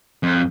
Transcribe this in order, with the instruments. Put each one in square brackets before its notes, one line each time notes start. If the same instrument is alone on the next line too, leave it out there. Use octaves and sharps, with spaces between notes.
[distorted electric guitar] F2